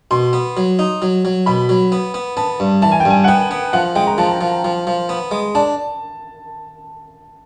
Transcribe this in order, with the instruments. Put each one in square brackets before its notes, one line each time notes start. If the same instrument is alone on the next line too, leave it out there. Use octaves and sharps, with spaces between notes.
[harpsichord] B2 [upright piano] C6
[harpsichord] B3
F#3
D#4
F#3
F#3
[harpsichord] B2 [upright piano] B5
[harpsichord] F#3
B3
B3
[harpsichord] B3 [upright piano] A5
[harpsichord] G2
[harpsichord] E3 [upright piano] A5
[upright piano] G#5
G5
[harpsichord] G2 [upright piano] G#5
[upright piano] F#5
[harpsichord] B3 [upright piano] G5
[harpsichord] B3
[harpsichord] F3 [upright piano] F#5
[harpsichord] G#3 [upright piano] G5
[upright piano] A#5
[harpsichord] F3 [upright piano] A5
[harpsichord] F3
F3
F3
B3
G#3
[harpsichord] D4 [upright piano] A5